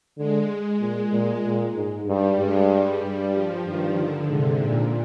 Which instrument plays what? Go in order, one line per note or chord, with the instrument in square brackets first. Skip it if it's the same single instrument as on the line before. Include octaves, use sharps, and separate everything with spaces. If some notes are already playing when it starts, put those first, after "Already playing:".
[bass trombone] D3 [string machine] G#3
[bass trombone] A#2
A#2
A#2
G#2
[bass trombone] G2 [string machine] G3
[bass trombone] G2 [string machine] G#3
[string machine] G3
[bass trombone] G2
[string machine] F3
[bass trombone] G2 [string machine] D#3
[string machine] D3
[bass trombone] G#2 [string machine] C3
[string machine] A#2